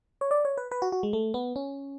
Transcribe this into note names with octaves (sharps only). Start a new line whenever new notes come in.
C#5
D5
C#5
B4
B4
F#4
F#4
G#3
A3
B3
C#4